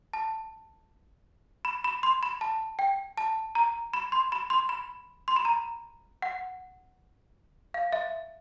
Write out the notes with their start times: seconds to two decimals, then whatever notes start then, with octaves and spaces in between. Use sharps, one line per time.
0.13 A5
1.65 B5
1.84 B5
2.03 C6
2.23 B5
2.41 A5
2.79 G5
3.18 A5
3.55 A#5
3.94 B5
4.12 C6
4.32 B5
4.50 C6
4.69 B5
5.28 C6
5.36 B5
5.45 A#5
6.22 F#5
7.74 F5
7.93 E5